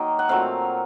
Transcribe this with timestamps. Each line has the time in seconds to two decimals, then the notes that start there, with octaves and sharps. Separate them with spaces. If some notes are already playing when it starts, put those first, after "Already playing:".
Already playing: D#3 F#3 A#3 D#5
0.19 F#5
0.29 A#2 F#3 A3 C4 F5